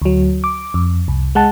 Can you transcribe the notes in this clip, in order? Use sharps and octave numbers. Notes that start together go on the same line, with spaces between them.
D2 F#3
D6
F2
C2
G#3 F#5 A5